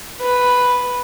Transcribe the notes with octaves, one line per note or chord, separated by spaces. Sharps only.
B4